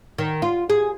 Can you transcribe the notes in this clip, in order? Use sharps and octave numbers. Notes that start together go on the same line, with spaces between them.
D#3
F4
G#4